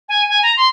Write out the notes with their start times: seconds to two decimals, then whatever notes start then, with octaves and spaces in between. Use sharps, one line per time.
0.09 G#5
0.29 G#5
0.43 A#5
0.57 C6